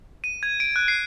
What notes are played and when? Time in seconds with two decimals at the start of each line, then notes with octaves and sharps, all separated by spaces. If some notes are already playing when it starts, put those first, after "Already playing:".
0.24 D#7
0.43 G#6
0.60 D7
0.76 F#6
0.88 C7